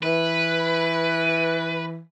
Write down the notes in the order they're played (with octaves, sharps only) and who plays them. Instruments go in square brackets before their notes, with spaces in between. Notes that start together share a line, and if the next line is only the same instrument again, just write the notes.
[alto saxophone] E3 [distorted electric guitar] B4